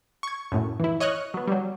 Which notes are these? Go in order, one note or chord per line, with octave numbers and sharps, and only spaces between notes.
C#6 G#6
F#2 A2
E3 E4
C#5 D#5 C#6 F6 F#6
F#3 B3
F#3 G3